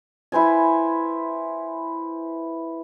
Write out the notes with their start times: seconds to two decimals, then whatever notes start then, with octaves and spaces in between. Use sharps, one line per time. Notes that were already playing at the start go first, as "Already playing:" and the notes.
0.32 E4 B4 C5 G#5